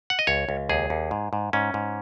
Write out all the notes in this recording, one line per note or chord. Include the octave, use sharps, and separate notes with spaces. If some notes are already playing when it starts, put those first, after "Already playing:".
F#5
D#5
C#2 C#5
C#2
D#2 G#4
D#2
G#2
G#2
G#2 C#4
G#2